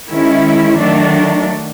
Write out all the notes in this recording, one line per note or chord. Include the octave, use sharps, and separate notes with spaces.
D#3 G#3 C#4 E4
D#3 F#3 A3 D4